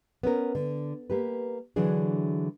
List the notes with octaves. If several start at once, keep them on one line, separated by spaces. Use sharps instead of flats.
B3 C#4 A#4
D3
A#3 G4 B4
D3 E3 F#3 D4 G#4